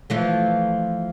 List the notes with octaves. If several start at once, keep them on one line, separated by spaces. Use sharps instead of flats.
E3 F3 A3